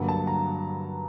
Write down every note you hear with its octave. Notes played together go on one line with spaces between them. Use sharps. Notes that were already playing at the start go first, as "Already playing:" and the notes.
Already playing: G2 D3 F#3 A#3 F#5
A5
A#5